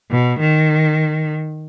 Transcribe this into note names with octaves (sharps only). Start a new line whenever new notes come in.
B2
D#3